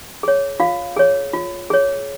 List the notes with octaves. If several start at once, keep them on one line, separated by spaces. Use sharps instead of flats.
G#4 C#5
F4 F5
G#4 C#5
F4
G#4 C#5